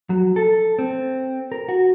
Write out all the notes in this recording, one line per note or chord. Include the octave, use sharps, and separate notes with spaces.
F#3
A4
C4
A#4
F#4